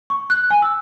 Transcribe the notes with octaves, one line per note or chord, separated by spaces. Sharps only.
C#6
F#6
G#5
E6